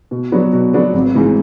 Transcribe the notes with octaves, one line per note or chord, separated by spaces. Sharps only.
B2
F#3 B3 D4 F#4
B2
F#3 B3 D4 F#4
G#1
G#2 E3